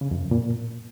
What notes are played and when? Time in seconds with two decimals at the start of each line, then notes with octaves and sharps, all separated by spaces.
0.01 C#3
0.11 F2
0.21 F#2
0.31 A#2